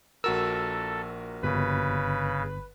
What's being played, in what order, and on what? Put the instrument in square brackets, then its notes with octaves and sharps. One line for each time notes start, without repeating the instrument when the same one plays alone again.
[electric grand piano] A#1 F#4 A#4 [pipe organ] A4 [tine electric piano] E6
[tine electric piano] G1 [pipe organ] C#3 [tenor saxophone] B4